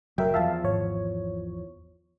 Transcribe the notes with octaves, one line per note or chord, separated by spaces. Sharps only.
F#1 F#3 A#4 E5 G5
E2 F3 E5 F5 A5
G#1 C#5